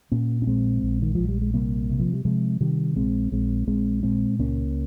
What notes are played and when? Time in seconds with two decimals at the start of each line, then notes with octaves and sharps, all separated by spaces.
0.12 A#2 A#3 C#4
0.42 C#4
0.47 A#1 G#3 C4
0.82 A#1
1.02 D#3
1.15 A#1 F3
1.29 G3
1.42 G#3
1.53 C3 G3 A#3
1.90 C3
2.00 F3
2.13 G3
2.25 C3 F3 G#3
2.60 C3 D#3 G3
2.96 A#1 G#3 C4
3.32 A#1 G#3 C4
3.67 A#1 G#3 C4
4.03 A#2 G#3 C4
4.39 C#2 A#3 C#4